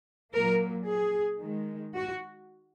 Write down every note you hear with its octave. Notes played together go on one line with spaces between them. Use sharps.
A#2 F#3 A#3 A#4
G#4
D#3 G#3
F#4